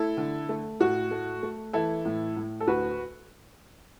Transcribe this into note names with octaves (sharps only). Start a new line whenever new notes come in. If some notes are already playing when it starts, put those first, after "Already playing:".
Already playing: A3 E4 A4
D3
A3
A2 F#4
A3
A3
E3 E4 A4
A2
A2
A4
D2 F#4 B4